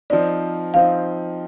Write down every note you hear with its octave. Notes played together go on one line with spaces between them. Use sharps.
F3 C4 D#4 D5
F3 C4 D#4 F5